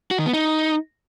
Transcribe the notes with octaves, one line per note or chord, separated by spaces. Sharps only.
F#4
D#3
B3
D#4